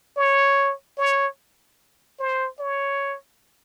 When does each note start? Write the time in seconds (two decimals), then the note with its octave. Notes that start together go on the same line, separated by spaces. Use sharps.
0.17 C#5
0.98 C#5
2.20 C5
2.59 C#5